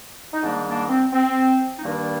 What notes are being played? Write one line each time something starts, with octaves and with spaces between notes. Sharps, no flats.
D#4
G#2 D#3 G3 A#3 D4
A#3 D4
C4
C4
D#4
G2 D#3 G3 A#3 D4